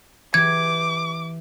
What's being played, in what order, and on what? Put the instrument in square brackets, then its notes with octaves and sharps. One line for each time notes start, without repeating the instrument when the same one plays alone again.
[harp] E3 G4 [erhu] D6 [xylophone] G#6